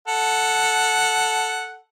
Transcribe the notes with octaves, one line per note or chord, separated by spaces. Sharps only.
A4 F#5